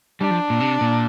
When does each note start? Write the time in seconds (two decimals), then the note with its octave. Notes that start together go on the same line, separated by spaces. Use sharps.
0.21 G3 D4
0.31 F3
0.50 A#2
0.60 C3
0.81 A#2